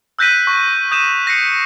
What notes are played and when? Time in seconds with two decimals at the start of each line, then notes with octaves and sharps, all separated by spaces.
0.19 E6 F#6 G6 A#6 B6 D#7
0.47 C#6
0.91 D#6 G6 D#7 E7
1.26 F#6 A#6 C7 C#7